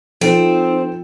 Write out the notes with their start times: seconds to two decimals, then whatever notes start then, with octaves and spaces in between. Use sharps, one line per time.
0.21 F3 C4 D#4 A4 C5